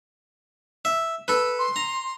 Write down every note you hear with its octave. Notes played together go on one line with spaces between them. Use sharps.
E5
A4 B4
C6
A#5